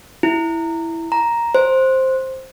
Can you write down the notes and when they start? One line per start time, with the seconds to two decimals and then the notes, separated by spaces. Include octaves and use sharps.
0.23 E4
1.12 A#5
1.55 C5